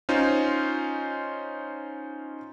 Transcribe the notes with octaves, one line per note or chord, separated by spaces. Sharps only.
C#4 D#4 F4 C5